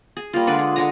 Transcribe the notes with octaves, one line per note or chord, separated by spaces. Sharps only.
G#4
G3 A#3 F4
D3 G#3 D4 B4
G#4
D3 G#3 D#5 A#5